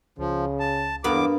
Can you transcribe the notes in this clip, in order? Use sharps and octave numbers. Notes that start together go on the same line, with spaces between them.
C#2 C#3 F3
A5
E2 G2 A#3 B3 D6